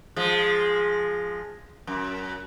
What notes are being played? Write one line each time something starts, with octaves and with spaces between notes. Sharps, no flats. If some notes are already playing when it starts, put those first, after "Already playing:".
F3 G#3
F#2